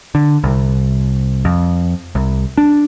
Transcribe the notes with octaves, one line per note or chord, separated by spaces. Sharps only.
D3
C2
F2
C2
D4